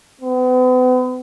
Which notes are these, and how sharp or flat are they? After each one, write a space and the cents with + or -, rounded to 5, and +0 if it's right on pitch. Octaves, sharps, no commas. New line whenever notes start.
B3 +40